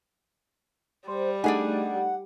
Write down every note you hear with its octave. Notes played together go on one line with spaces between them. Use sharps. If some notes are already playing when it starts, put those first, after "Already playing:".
G3 C5
A3 D4 D#4 G#4 F#5 G#5